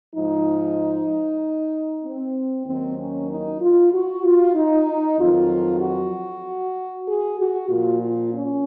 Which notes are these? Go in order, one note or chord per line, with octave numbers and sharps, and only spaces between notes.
G#2 F3 D#4
C4
D#2 D#3 F#3 C4
C#4
D#4
F4
F#4
F4
D#4
F2 D#3 F#3 F4
F#4
G#4
F#4
A#2 F3 F4
F4
C#4